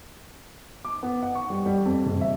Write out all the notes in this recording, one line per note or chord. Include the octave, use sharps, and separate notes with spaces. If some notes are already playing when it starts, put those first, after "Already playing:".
D6
B3
F#5
C#6
G3
G3
F2
F#1
E5